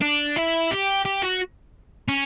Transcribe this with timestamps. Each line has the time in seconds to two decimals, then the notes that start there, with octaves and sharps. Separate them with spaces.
0.02 D4
0.37 E4
0.71 G4
1.05 G4
1.22 F#4
2.08 C#4